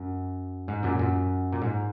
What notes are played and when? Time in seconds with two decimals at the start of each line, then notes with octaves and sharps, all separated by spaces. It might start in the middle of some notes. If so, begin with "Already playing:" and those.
Already playing: F#2
0.68 G#2
0.83 F#2 A#2
0.99 F#2
1.52 A#2
1.62 G#2